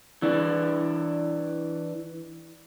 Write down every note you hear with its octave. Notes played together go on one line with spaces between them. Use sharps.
E3 D4